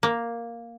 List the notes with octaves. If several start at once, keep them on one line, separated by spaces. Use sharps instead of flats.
A#3